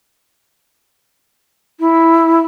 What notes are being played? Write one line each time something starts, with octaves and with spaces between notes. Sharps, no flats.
E4